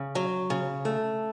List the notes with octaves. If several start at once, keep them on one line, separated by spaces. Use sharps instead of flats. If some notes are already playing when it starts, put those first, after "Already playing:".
Already playing: C#3
F#3
C#3
A3